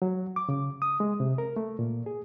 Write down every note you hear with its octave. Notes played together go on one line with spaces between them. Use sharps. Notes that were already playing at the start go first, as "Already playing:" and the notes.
F#3
D6
C#3
D#6
G#3
C3
A#4
A3
A#2
G#4